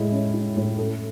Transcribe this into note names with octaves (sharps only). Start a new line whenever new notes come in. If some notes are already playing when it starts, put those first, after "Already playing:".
Already playing: A2 G#3 E4
C#4
E4
A2
A4